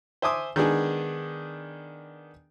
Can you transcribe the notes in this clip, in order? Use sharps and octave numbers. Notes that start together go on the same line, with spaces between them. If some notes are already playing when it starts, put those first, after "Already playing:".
C5 E5 G#5 D6 D#6
D#3 G#3 B3 D4 G#4